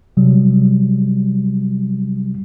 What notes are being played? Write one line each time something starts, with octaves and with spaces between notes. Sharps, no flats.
C3 F#3 G3